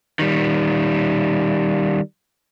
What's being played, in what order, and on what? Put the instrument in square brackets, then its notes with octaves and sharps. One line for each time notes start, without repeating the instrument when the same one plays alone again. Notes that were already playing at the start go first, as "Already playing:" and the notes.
[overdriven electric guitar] D#3 G3